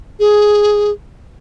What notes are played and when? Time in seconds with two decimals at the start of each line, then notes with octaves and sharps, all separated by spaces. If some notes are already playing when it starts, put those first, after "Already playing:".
0.20 G#4